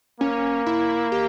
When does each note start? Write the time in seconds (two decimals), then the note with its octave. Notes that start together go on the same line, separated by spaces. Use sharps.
0.20 A#3 C#4
0.66 E4
1.12 G4